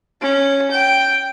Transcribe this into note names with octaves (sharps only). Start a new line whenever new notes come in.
C#4
G5